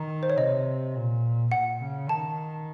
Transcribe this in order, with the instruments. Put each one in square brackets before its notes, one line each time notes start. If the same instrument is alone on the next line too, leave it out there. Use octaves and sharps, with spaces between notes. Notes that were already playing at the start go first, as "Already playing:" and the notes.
Already playing: [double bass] D#3 [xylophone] A#5
[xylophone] C5
C#5
[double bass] C3 [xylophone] D#5
[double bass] A#2
[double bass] A#2 [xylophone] F#5
[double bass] C#3
[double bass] D#3 [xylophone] A5